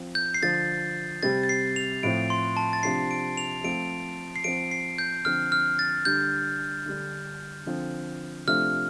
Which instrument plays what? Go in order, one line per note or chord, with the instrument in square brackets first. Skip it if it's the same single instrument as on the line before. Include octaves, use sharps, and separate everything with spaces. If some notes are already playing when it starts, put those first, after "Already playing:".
Already playing: [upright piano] F3 C4
[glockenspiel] G6
C7
[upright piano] D3 F3 D4 [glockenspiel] A6
[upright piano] C3 G3 C4 [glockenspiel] A6
[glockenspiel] A6
C7
F7
[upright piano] A2 F3 C4 [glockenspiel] D7
[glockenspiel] C6
A5
A6
[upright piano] C3 F3 D4 [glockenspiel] C7
[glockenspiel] D7
F7
[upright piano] F3 A3 C4 [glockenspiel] D7
[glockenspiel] C7
[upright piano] F3 C4 [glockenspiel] D7
[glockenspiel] C7
G6
[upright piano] D3 F3 C4 [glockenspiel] F6
[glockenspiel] F6
A6
[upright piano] D3 G3 D4 [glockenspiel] G6
[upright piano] D3 G3 D4
D3 F3 C4
[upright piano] C3 F3 A3 D4 [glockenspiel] F6